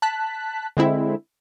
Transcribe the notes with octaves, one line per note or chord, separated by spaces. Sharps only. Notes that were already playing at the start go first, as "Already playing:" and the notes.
A5 F#6 B6
D3 G#3 C4 E4